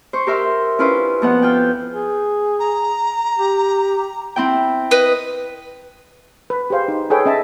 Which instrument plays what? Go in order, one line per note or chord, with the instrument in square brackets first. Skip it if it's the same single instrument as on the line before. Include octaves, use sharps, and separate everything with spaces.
[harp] C5 C#6
G4 A#4 E5 C6
C#4 D4 E4 F4 B4 C5
F2 B3 F#5
F4 G5
[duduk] G#4
[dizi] A#5
[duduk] G4
[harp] C4 E4 G5
[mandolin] B4 D#5
[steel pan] B4
G4 G#4 C5 F5
D#4
G#4 A4 B4 C#5 G5
C#4 D#5 E5 A5